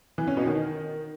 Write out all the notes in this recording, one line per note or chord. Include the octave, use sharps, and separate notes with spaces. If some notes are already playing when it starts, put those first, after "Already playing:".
E3
C#4
B2
D#3